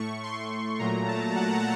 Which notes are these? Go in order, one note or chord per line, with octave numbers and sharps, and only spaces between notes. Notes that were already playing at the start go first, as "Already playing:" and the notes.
Already playing: A2 A3 C#6
C6
A#2 F#3 A3 A#5
A5
F#5